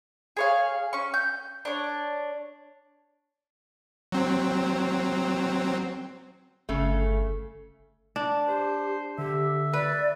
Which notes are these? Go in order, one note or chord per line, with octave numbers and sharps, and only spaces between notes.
G#4 C#5 F5
C#4 C#6
G6
D4 C#5
F#3 C4
G1 C#3 A3
D4
G4 C5
D3 G4 E5
B4 D5